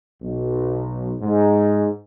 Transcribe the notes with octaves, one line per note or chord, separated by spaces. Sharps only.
B1
G#2